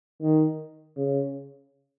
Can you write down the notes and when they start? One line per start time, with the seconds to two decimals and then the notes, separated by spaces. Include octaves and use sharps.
0.21 D#3
0.97 C#3